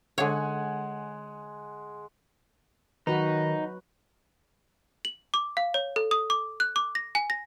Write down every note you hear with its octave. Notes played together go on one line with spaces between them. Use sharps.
D3 G#3 C#5 F#5 G#5
D#3 F#3 D#4 F#4 B4
F#7
D6
F5
C#5
A4
D#6
D6
F#6
D6
A#6
G#5
A#6